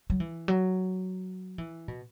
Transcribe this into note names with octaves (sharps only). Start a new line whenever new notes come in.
F#3
E3
F#3
E3
B2